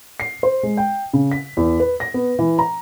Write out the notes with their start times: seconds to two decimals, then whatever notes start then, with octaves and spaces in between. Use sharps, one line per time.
0.20 C7
0.43 C5
0.63 G#3
0.77 G5
1.13 C#3
1.32 B6
1.57 E2
1.80 B4
2.00 A#6
2.14 B3
2.39 E3
2.59 A#5